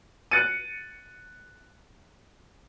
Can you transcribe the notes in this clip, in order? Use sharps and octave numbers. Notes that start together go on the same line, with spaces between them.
F#6 A6 C#7 D#7